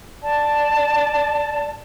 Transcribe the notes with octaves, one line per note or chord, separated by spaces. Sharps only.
D5 A5